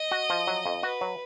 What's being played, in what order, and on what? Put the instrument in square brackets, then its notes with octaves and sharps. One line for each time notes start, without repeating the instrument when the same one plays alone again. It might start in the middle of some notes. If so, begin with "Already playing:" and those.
Already playing: [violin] D#5
[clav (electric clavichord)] F#4
F3
F#3
F2
[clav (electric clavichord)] F#4 [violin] B4
[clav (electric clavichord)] F#3